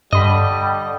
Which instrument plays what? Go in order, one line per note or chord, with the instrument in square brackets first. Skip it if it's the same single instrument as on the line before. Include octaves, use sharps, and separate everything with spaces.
[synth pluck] G2 B5 [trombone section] D3 G3 [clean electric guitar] D#5